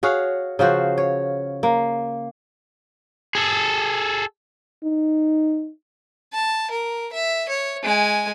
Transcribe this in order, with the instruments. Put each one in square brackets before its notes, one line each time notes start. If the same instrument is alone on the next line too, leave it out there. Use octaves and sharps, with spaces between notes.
[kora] F#4 G#4 C#5 F5
C#3 F3 F#4 C5
C#5
A#3
[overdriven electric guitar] G#4 A4
[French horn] D#4
[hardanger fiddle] A5
A#4
E5
C#5
G#3 G#5